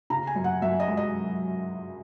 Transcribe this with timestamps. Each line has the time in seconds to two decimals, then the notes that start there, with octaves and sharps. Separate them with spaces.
0.10 C#3 A#5
0.27 G#5
0.36 F#2
0.44 F#5
0.62 F#2 E5
0.80 D#5
0.88 G#3
0.97 D#5